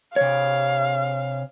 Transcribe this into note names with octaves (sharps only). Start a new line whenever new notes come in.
C3 C#5 F5